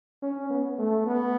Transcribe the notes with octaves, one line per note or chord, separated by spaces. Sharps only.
C#4
B3
A3
B3